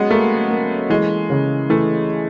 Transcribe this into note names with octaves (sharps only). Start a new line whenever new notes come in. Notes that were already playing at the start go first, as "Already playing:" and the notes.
Already playing: F#3 G#3 B3 C#4
A3 A#3
A#3
E3 G#3
C#3
E3 A3